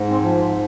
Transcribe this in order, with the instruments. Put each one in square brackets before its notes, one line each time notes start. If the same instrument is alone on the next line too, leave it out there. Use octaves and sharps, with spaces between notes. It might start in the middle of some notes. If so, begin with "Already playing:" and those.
Already playing: [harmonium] G#2
C4
F3